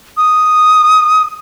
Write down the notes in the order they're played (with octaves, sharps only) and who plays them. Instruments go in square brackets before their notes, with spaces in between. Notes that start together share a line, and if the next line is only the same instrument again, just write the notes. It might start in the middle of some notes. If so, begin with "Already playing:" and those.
[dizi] D#6